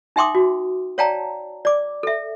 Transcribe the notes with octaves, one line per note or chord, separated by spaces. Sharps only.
D#4 E5 G5 C6 D6 D#6
F#4
C#5 D5 F5 G5 A5 A#5
D5 D6
A4 E5